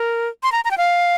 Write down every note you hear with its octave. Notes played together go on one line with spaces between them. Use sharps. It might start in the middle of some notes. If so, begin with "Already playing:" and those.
Already playing: A#4
C6
A#5
A#5
G5
F5